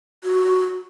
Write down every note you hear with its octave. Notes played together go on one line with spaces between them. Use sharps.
F#4